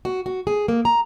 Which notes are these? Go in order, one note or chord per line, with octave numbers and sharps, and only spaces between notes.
F#4
F#4
G#4
A#3
A#5